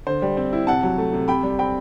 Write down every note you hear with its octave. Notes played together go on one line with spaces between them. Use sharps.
D3 C5
G3
C4
E4
C3 F#5 A5
F#3
A3
C3
C3 G5 B5
G3
C4 G5 B5